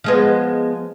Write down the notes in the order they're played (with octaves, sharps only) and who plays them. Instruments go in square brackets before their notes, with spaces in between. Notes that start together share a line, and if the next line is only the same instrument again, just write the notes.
[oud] F3 G#3 B3